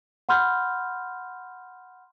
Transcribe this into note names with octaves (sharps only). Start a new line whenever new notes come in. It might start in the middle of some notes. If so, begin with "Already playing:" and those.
F#5 B5 C6 F6 G6